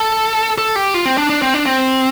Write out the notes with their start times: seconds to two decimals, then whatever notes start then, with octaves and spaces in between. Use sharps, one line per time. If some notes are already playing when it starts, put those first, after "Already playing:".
Already playing: A4
0.58 A4
0.76 G4
0.94 F4
1.05 C4
1.18 D4
1.30 D4
1.42 C4
1.54 D4
1.66 C4